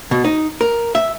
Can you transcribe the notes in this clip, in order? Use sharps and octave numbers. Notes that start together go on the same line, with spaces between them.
B2
D#4
A#4
E5